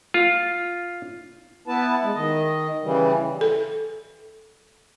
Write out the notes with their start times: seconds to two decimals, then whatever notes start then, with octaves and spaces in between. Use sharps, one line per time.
0.14 F4
1.67 B3 E4 B4 A5
2.03 G#3
2.14 D#3 D#5
2.82 C#3 E3 G3
3.41 A4